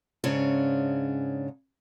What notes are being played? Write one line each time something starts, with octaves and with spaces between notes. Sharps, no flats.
G#2 C#3 C#4 D4